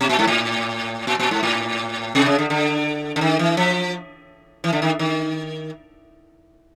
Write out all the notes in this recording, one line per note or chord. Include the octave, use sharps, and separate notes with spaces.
B2
A#2
G#2
A2
A#2
A#2
G#2
A2
C3
C#3
D3
D3
D3
D#3
E3
F3
E3
D3
D#3
D#3